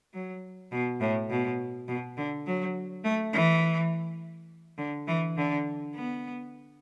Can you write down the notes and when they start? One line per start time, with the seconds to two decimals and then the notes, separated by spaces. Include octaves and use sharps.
0.14 F#3
0.72 B2
1.01 A2
1.30 B2
1.88 B2
2.17 D3
2.47 F#3
3.04 A3
3.33 E3
4.78 D3
5.07 E3
5.37 D3
5.95 B3